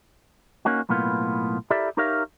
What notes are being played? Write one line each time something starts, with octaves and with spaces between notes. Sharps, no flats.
A#3 C#4 D#4 F#4
B1 A2 A#3 B3 F4
E4 G4 A4 A#4 D5 E5
D#4 G4 A#4 C#5 E5 F5